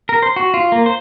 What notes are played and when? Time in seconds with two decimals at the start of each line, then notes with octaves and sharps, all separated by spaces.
0.09 A#4
0.22 C5
0.36 F#4
0.54 F4
0.72 A#3
0.86 C5